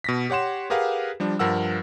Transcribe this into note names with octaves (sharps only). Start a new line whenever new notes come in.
B2 A#6 B6
G4 C#5 F#5 C6 E7
G4 G#4 A#4 B4 F5 F#5
F3 G3 D4
G2 F3 A#4 F#5 E6